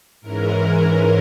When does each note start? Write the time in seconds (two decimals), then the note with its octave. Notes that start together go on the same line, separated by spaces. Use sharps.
0.21 G#2 E3 G#3 C#4 A#4